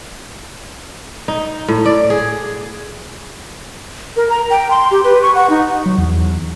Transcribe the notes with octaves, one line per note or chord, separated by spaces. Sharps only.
D#4
A2
D5
G#4
A#4
A#5
G5
C6
G4
B4
C#6
F#5
D#4
F#3
E2